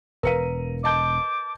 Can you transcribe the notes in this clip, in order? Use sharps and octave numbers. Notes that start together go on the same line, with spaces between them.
E1 A#4 B4 F5 A#5 C#7 D#7
D#5 A5 D6 G6